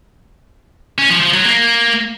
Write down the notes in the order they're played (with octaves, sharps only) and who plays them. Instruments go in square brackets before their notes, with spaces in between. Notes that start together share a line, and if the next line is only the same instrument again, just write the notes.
[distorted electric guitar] C#4
F3
F3
F#3
A#3